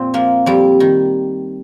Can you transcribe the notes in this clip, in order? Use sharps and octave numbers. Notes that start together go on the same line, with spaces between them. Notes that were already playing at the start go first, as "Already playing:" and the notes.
Already playing: F2 A#2 C4
F3 A#3
F2 G3
D#3